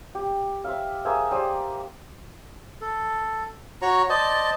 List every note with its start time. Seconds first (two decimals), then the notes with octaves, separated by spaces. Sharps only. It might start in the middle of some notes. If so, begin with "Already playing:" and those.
0.15 G4
0.64 C5 E5 F5
1.05 A#3 G#4 C5 E5
1.31 G4 C5 D5 D#6
2.81 A4
3.82 F#4 C#5 A#5 C#6
4.10 C5 D5 D#5 A5